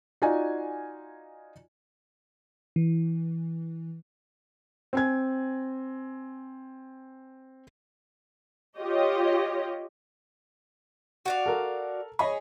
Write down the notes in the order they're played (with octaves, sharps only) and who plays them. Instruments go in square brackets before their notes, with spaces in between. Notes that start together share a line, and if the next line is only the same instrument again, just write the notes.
[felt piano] D#4 F4 F#4 D5 G#5
[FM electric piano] E3
[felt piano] C4 G#5 G#6
[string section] F4 G4 C#5 D#5
[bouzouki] F#4 D5 F5
[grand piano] A4 A#4
[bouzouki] G#4 [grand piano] C#5 D#5 B5